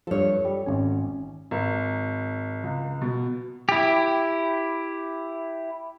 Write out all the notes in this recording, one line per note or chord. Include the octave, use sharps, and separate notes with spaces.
G2 F3 A4 C#5
G3
G#1 C#4 G#5
G#1
C#2
B2
E4 G4